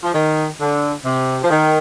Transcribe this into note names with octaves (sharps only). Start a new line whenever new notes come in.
F3
D#3
D3
C3
F3
D#3